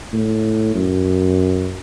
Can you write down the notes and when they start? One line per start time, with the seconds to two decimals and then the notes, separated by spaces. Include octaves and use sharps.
0.13 A2
0.75 F#2